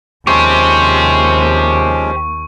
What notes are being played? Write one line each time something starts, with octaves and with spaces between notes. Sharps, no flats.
D#2 F3 G#3 C#4 G4 C5 C#6